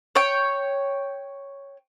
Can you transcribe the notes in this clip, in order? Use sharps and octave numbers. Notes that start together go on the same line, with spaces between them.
C#5 G5